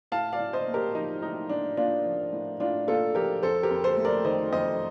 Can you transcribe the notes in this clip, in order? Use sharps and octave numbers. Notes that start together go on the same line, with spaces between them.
A2 F5 A5
D5 F5
A2
C5 D#5
A#3
G4 A#4
F3 D#4
A2 D#4
A2 D4
A#3 D4 F4
F3
A2
A2 D4 F4
A#3 F4 A4
F3 G4 A#4
F2 A4 C5
G4 A#4
F2
A4 C5
A3
A#4 D5
D#3 C5 D#5
F2 C5 D#5